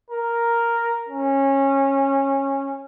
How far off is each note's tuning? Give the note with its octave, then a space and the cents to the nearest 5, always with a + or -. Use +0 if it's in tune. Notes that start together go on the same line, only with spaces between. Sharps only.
A#4 +0
C#4 -20